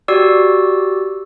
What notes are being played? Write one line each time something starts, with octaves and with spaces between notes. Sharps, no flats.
F#4 G4 D5 E6